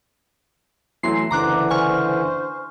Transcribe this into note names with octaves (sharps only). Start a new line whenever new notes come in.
E3 F#3 A3 C6 C7
F#1 D3 E3 D4 A#5 D6 F#6
C5 G#5 C#6 F6